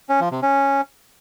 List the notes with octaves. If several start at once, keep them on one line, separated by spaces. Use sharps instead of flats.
C#4
F3
C3
C#4